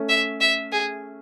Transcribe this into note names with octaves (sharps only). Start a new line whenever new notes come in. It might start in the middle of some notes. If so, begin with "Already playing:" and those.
Already playing: A3 C#4
E5
E5
G#4